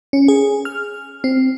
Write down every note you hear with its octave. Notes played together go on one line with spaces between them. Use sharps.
C#4
G#4
F6
C4